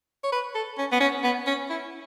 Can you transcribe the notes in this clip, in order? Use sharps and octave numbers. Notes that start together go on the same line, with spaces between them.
C#5
B4
A4
C#4
B3
C#4
B3
C#4
E4